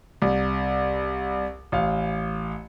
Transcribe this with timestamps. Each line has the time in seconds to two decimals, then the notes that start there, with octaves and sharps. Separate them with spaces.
0.22 C2
1.72 A1 F5